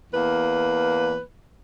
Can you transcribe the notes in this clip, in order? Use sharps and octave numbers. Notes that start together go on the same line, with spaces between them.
E2 A#3 B4